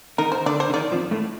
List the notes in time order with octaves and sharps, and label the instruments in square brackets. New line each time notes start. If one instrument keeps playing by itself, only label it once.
[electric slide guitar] D#3 [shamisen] A#4
[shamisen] C5
[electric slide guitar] D3 [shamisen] D5
[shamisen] C5
[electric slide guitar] D3
[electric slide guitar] D#3 [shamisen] D5
[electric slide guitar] F2 F3
A2 A3